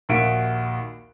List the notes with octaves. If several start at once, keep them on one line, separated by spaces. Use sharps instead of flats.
A#1 D#2 F#4 E5 D7